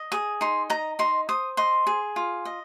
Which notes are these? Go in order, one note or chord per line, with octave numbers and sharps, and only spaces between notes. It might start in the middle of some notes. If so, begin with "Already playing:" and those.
Already playing: D#5
G#4 D#6
D#4 C6
D#5 A#5
D#4 C6
C5 D#6
D#5 C6
G#4
F4
D#5